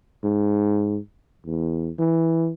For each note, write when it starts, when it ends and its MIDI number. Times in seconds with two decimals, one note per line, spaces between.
0.24 0.99 44
1.46 1.91 40
1.99 2.51 52